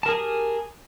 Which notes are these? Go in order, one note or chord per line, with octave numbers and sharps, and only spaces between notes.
G4 G#4 A#4 G#5 A5